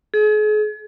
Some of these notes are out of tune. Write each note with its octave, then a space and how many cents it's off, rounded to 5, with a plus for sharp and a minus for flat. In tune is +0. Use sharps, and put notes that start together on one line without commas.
G#4 +40